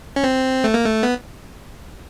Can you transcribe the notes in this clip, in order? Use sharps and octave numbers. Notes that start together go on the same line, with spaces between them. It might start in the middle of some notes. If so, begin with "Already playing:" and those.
C#4
C4
A3
A#3
A3
B3